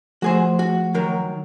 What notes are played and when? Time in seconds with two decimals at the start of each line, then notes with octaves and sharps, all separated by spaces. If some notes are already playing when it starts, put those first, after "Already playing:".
0.22 F3 A3 F#4 G#4 C5
0.59 F#4
0.94 D#3 F#3 A#4